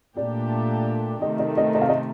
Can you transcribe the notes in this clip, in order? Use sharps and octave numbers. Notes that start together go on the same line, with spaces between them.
A#2 A3 D4 G4 D5
C3 D#3 A3 D#5
D#5
D#5
D#5
F5
D#5